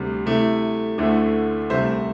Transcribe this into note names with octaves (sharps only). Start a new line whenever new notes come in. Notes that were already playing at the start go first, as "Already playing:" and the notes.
Already playing: D2 C3 G3
C3 A3 E4
D2 D3 A3 E4
C2 C3 A3 C5 E5